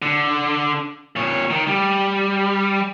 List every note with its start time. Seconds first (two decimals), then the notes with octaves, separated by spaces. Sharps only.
0.02 D3
1.16 A#2 C#5
1.50 D#3
1.67 G3